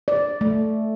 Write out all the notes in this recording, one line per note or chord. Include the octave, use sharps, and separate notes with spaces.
D5
A3